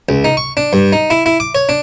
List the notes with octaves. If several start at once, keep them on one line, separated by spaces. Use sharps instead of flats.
C#2
D#4
C#6
D4
G2
D#4
E4
E4
D6
C#5
D4